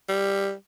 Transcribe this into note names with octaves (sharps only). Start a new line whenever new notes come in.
G3